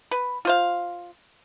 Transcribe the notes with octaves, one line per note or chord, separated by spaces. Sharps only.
B4
F4 C5 F5